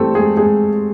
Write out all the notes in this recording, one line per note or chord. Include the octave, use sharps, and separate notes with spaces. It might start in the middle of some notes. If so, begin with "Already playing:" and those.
Already playing: E3 G3 A3 C4 A4
G#3 G#4
G#3 G#4